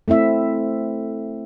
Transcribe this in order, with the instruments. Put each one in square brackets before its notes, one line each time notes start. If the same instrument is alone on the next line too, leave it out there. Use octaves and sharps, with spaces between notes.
[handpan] A3 C4 E4 E5